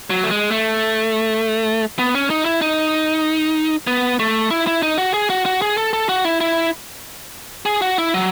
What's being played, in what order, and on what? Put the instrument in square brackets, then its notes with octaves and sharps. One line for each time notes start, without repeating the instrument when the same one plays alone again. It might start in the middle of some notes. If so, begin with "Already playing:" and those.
[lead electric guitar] F#3
A3
G#3
A3
B3
C#4
D#4
E4
D#4
B3
A3
E4
E4
D#4
F#4
G#4
F#4
F#4
G#4
A4
A4
F#4
E4
E4
G#4
F#4
E4
F#3